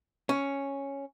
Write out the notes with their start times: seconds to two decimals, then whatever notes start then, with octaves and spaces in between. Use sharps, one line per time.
0.29 C#4